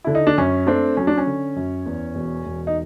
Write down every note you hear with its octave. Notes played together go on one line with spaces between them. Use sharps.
D3 E4
D#4
D4
F#2 C#4
A3 C4 D4
F#3 C#4
D4
C#4
D3
F#2
E2
E1
E1
D#4